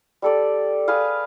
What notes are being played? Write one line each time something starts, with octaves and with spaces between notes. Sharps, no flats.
G3 A4 D5
G#4 B4 F5